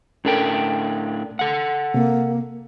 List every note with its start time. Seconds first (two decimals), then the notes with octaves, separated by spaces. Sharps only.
0.25 A2 C#4 D4 A4 A#4 G5
1.39 A4 F#5
1.94 C3 A#3